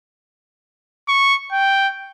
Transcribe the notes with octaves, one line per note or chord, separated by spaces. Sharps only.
C#6
G5